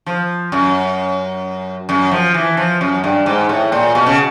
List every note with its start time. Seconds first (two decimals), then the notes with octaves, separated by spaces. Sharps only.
0.06 F3
0.52 F#2
1.89 F#2
2.11 F3
2.34 E3
2.57 F3
2.81 F#2
3.04 G2
3.26 G#2
3.49 A2
3.72 A#2
3.95 B2
4.06 C#3